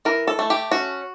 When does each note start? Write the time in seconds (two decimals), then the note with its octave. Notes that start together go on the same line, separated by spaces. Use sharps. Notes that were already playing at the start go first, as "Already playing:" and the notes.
0.05 E3 A#4
0.27 A4
0.39 A3
0.50 G4
0.71 C#4 F#4